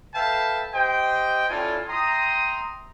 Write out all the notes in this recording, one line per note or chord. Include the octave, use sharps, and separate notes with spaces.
A4 B4 E5 F5 G5 A5
G4 C5 D#5 G5
C#4 E4 F4 A4 D5 G#5
E5 G5 A#5 C6 D#6